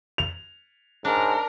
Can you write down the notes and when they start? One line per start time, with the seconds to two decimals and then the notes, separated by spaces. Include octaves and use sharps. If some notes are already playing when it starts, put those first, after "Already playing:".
0.18 F7
1.05 G#2 D4 A#4